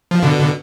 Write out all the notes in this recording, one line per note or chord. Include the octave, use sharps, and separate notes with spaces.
F3
B2 D3